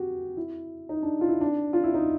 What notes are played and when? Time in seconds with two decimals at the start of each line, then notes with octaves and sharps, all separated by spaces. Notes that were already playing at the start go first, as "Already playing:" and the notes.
Already playing: F#4 G4
0.37 E4
0.89 D#4
1.02 D4
1.21 F4
1.28 E4
1.41 D4
1.73 F4
1.84 E4
1.94 D#4